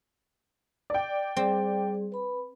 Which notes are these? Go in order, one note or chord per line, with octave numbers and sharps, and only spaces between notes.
D5 G5
G3 C4 G#4
B4 B5